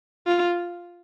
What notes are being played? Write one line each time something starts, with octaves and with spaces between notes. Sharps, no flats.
F4